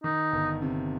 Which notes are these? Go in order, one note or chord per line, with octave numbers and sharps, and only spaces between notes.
D#3 D#4
G1
C3